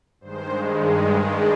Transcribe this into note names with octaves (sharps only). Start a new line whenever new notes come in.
G2 D#3 G#3 C5
D5